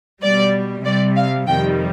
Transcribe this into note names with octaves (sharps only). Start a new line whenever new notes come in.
B2 G3 D5
C3 G3 D5
F5
F2 C3 D#3 G3 G5